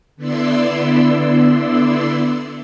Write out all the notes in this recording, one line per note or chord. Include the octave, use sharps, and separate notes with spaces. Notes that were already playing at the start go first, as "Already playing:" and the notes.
D3 B3 E4 D5 C6 E6